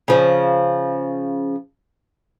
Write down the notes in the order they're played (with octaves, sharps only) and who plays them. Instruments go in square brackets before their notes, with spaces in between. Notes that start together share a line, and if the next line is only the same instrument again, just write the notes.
[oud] C#3 F3